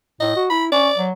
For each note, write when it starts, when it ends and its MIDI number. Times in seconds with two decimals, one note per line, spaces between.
0.21 0.31 45
0.21 0.44 75
0.36 0.46 66
0.50 0.68 64
0.50 0.65 83
0.72 0.89 61
0.72 1.04 74
0.97 1.11 54